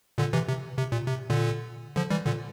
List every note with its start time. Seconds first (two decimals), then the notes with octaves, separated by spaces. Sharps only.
0.18 A#2 D3
0.33 C3 E3
0.48 C3
0.78 C3
0.92 A#2
1.07 C3
1.30 A#2 D3
1.96 D3 F3
2.11 E3 G3
2.26 A#2 D3